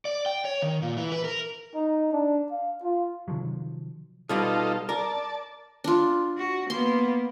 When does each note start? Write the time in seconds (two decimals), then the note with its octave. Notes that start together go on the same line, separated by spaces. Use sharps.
0.05 D5
0.26 G5
0.45 C#5
0.62 D#3
0.82 A#2
0.97 E3
1.12 B4
1.24 A#4
1.75 D#4
2.12 D4
2.51 F5
2.83 F4
3.28 C3 D#3 F3 F#3
4.29 B2 G3 B3 D#4 F4 A4
4.89 A#4 D5 A5
5.84 D4 F4
6.38 F#4
6.70 A#3 B3 C6